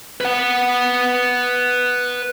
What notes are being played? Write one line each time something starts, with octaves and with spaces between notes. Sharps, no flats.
B4 F#5